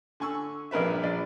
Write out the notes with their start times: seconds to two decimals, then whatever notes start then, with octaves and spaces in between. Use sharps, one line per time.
0.20 D3 G#5 C#6 E6
0.71 A#1 G2 A#4 B4 E5
1.03 A#1 D5